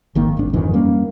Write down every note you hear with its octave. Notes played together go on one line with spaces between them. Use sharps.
G#1 D#3 A#3
D1 G#1 G#2 D4
F2 G#2 D#3 E3
G3 A#3 C#4